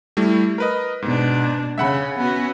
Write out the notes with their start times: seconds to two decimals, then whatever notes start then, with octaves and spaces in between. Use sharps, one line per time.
0.17 G3 A3 E4
0.58 A#4 B4 D#5
1.02 G#2 B2 D4
1.78 C#3 E5 F#5 B5
2.17 B3 C#4 F#4